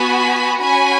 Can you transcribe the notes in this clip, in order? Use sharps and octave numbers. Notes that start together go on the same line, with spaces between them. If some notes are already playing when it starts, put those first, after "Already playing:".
Already playing: B3 F#4 G#5 B5
C#4 F#4 G#5 B5